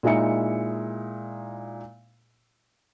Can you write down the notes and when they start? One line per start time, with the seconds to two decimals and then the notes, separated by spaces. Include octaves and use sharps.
0.03 A#2 G#3 D#4 E4 E5 C#7